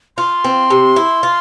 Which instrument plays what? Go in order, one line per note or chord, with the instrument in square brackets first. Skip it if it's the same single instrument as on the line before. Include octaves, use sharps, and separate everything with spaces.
[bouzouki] F4 [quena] C6
[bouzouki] C4
C3
E4
F4